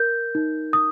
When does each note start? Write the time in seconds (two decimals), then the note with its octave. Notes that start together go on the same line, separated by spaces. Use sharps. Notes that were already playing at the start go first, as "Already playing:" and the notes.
Already playing: A#4 G6
0.35 D#4
0.73 D#6